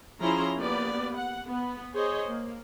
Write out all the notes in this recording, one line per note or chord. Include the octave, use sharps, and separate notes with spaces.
F3 C#4 E4 G#4 A#5 C6
A#3 B3 G4 B4 D5
F#5
B3
G#4 C5 C#5 D#5
A#3